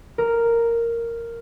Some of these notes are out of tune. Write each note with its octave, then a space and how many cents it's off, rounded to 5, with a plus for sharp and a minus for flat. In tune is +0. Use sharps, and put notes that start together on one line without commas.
A#4 -5